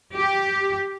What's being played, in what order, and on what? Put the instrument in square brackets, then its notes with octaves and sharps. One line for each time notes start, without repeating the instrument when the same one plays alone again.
[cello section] G4